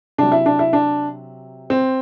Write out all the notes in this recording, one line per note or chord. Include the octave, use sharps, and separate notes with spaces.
C3 F#3 D4
E4
D4
E4
D4
C4